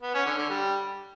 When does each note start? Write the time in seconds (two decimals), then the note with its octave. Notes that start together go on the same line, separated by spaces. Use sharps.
0.02 B3
0.14 C#4
0.26 D3
0.38 D3
0.50 G3